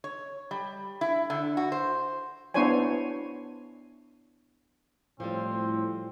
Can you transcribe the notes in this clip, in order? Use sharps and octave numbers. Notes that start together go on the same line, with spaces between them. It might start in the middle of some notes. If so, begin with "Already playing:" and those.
C#5
G3
E4
D3
F#4
C5
B3 D4 E4 C5 C#5 G#5
A2 F3 G3 C4